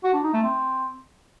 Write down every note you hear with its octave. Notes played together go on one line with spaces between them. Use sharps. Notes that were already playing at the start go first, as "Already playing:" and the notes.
F#4
D4
D#4
A3
C4